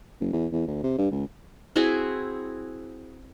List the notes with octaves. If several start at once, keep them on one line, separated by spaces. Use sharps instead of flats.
F#1
E2
E2
D2
C3
G2
C#2
C4 E4 F#4 G#4